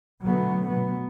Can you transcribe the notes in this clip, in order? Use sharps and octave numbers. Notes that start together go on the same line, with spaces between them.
B2 D3 F#3 A3 B3
B2 F#3 B3